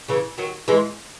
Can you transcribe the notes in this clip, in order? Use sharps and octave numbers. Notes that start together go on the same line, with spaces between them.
C#3 E3
D#3 F#3
E3 G#3